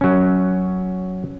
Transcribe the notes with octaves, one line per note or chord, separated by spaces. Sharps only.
F#3 C#4